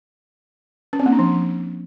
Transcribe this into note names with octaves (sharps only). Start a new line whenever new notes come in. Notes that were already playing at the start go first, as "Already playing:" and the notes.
C#4
C4
A#3
D4
F3